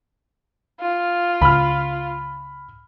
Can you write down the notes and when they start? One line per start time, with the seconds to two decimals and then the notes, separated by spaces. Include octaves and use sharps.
0.81 F4
1.41 C#2 B5 F6